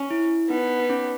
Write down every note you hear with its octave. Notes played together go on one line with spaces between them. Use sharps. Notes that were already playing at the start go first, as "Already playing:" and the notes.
Already playing: C#4
E4
B3 D#4
D#4
C#4